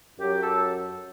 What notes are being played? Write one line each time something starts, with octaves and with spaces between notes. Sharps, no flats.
F#2 F#3 G4
A4